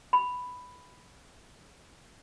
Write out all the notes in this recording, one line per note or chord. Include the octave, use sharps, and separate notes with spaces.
B5